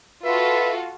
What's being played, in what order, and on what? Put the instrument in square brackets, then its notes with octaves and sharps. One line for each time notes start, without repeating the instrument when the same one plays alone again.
[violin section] F4 F#4 A4 [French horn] B4 [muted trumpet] E5